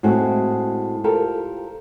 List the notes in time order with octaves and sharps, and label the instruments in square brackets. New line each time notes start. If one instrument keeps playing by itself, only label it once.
[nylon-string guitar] A2 G#3 C4 F#4 G#4
F4 G4 A4 A#4 C5